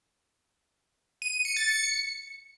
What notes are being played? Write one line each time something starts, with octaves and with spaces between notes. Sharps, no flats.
D#7
D#7
C#7
A6
C#7